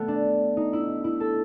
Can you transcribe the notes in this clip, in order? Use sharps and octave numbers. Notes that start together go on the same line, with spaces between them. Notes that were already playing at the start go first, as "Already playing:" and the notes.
Already playing: A3 B3
D4
D#4
E4
E4
A4